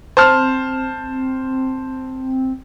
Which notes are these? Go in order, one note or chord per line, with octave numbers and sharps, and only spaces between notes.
C4 C5 A5 F6